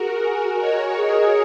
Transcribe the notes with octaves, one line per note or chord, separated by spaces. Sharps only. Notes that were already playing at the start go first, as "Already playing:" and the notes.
Already playing: F#4 G#4 A#4
G#5
A#4 C#5 D#5
G#4